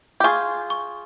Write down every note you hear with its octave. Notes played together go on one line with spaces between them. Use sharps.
G4
F4 G#4 C#6
C#6